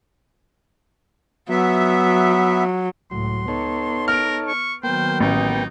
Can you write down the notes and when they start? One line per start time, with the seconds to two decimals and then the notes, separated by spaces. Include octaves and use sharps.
1.50 F#3 B3 E5
3.11 C#2 A2 F#3 C6
3.48 B3 D#4 A4 C#5
4.08 A#4 F6 D7
4.48 C#6
4.83 D#3 F#3 A#3 B3 C5 G5
5.20 A1 D#4